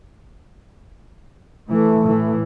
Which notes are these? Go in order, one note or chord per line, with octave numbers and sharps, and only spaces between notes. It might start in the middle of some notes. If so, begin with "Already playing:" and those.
E3 A3
A2 E3